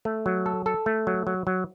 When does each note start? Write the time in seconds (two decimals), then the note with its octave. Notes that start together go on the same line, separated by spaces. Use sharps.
0.05 A3
0.26 F#3
0.46 A4
0.66 A4
0.86 A3
1.07 F#3
1.27 F#3
1.47 F#3